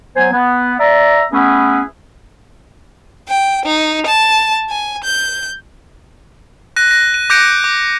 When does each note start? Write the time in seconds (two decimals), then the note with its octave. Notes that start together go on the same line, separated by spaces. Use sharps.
0.16 F#3 B3 C5 G#5
0.32 B3
0.79 D5 E5 A#5
1.32 A3 B3 C#4 E4 G#4 B4
3.28 G5
3.65 D#4
4.07 A5
4.70 G#5
5.04 G6
6.76 F#6 A#6 D#7
6.91 A#6
7.14 D#7
7.30 D6 F#6 G6 A#6 C#7 D7
7.64 D6